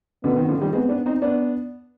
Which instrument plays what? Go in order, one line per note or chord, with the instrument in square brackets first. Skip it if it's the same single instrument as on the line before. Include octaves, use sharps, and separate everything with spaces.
[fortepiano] B2 D3 [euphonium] B3
[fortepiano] C3 D#3
D3 F3
D#3 G3
[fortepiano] G#3 C4 [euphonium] B3
[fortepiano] B3 D4
C4 D#4
B3 D4